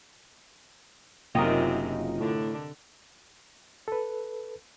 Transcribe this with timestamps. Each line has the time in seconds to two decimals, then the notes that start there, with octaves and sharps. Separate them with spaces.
1.35 F#1 F#2 C3 D#4 F4 G4 A#4 D#5
2.20 A2 D3 D4
3.88 A4 B4